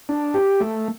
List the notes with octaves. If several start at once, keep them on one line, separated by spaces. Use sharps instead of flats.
D4
G4
A3